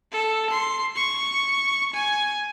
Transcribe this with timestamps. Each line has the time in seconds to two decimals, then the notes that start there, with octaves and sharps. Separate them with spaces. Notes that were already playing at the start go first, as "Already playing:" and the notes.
0.12 A4
0.50 C6
0.96 C#6
1.94 G#5